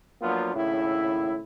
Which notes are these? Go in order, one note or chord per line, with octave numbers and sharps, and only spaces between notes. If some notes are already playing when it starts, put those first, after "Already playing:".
F3 F#3 A#3 B3 D4 F4
G#1 A2 C#3 E4